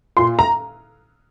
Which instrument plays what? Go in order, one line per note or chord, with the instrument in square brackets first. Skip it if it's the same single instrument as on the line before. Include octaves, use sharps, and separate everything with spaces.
[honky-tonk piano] A#2 C6
A#5